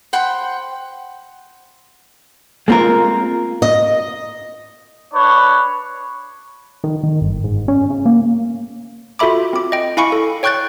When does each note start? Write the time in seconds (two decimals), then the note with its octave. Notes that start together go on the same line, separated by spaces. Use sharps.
0.13 C5 F#5 G5 B5
2.68 G#3 A#3 C4 F4 A#4
3.62 D#5
5.13 D4 B4 C#5
6.84 D#3
7.03 D#3
7.22 G1
7.44 G#2
7.68 C#4
7.90 C#3
8.06 A#3
9.19 F4 F#4 A4 E5 B5 D6
9.53 C4 D6
9.72 D#5 G5
9.97 E4 F5 G#5 B5 C#6 C#7
10.12 A4
10.43 C#5 G5 C#6 F#6 G6 A6